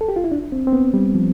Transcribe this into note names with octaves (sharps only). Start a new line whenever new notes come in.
A4
G4
F4
E4
D4
C4
C4
B3
G3
F3